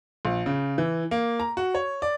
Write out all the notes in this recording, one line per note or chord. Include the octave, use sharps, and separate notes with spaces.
A#1
C#3
E3
A#3
A#5
F#4
C#5
D5